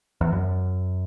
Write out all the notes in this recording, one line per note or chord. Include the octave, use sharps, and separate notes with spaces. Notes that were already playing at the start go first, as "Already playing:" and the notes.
E2
F#2